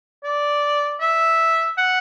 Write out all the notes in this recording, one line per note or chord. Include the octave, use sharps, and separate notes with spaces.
D5
E5
F#5